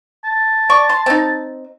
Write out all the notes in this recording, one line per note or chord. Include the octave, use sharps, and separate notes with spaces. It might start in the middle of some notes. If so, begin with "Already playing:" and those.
A5
D5 C#6
C6
C4 D#4